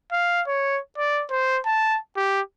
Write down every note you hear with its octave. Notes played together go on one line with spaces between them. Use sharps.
F5
C#5
D5
C5
A5
G4